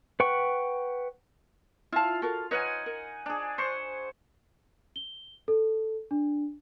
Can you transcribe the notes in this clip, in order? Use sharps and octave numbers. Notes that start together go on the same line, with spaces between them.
B4 F#5 G5 C#6
E4 F4 F5 A5
F#4 A4 A#4
D#4 B4 C#5 F#5 G#5
A#4
D4 G#4
C5 C#6
G7
A4
D4